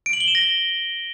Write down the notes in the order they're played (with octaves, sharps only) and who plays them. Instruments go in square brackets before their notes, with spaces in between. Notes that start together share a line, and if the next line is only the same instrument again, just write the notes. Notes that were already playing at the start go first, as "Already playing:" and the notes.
[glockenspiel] D7
F#7
G7
E7
A#6